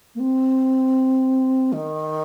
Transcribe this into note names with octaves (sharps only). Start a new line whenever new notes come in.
A#3
C4
D#3